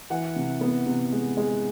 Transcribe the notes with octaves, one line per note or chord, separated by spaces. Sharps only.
E3 F#5
C3
B3
C3
G#3
G#3